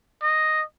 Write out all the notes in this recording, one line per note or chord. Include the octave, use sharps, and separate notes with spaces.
D#5